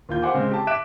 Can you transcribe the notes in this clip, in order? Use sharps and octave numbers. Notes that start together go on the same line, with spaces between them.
D#2 F4 G6
G4 C5 F5 F#5 G#5 D6
C#3 G#3 C4
G4 A5
E5 D6 F#6 B6 D7 E7